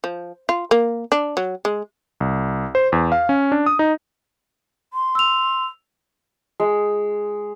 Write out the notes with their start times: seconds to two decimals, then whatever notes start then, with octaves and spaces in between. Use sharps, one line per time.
0.04 F3
0.49 F4
0.71 A#3
1.12 D4
1.37 F#3
1.65 G#3
2.20 C2
2.75 C5
2.92 E2
3.12 F5
3.29 C#4
3.52 D4
3.66 D#6
3.79 D#4
4.94 C6
5.15 E6 F7
6.60 G#3